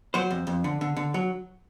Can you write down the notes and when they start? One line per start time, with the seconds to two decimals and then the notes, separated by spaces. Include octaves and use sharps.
0.14 F#3 C5
0.31 F2
0.47 F2
0.64 D3
0.81 D3
0.97 D3
1.14 F#3